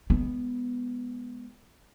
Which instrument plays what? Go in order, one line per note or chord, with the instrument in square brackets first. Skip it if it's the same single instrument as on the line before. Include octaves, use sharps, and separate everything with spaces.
[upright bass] G#3 B3